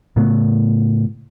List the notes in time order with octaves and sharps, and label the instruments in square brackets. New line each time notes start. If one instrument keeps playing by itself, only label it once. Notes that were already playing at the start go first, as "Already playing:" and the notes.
[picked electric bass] A2 C#3 A3 B3